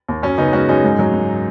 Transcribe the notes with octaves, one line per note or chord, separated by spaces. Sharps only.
D#2
F#2 C#4
C#3 B3 D#4
G#3 C#4 F#4
F#2 D#4 G#4
G#2
F#3
G#2